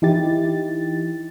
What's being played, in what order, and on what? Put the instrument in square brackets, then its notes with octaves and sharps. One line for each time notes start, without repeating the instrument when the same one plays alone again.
[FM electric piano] E3 D#4 E4 G4 A6